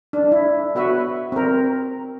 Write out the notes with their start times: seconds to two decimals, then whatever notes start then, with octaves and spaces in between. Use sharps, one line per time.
0.13 D4
0.32 E4
0.75 B3 F#4 B4 E5
1.32 C4 A#4